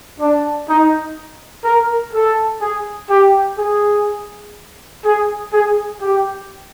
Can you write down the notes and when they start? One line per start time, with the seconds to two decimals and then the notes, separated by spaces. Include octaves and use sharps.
0.20 D4
0.67 D#4
1.65 A#4
2.13 A4
2.61 G#4
3.10 G4
3.58 G#4
5.04 G#4
5.52 G#4
6.00 G4